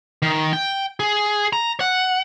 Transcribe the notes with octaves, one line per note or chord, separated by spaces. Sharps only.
D#3
G5
G#4
A#5
F#5